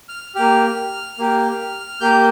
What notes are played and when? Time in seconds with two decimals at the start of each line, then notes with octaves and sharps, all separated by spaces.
0.09 F6
0.35 A#3 G4 F6
1.18 A#3 G4
2.00 A#3 G4 G6